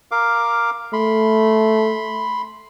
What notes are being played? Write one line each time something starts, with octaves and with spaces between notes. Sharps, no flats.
A#4 F5 D6
A3 B5 C6